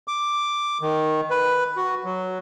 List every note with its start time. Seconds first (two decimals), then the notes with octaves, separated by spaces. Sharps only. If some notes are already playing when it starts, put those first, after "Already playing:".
0.08 D6
0.81 D#3
1.30 B4
1.76 F#4
2.04 F#3